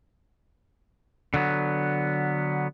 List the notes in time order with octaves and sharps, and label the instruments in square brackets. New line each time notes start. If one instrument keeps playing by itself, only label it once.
[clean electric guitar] D3 F#3 B3